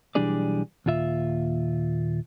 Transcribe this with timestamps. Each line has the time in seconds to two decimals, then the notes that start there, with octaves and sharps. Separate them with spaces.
0.15 B1 E3 G3 D4 G#4 D5
0.86 D#2 A#2 F4 E5